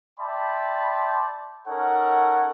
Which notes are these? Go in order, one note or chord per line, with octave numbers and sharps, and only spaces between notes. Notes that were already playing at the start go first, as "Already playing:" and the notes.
D5 E5 G5 A5 B5 C6
C#4 D#4 A4 A#4 C#5 F#5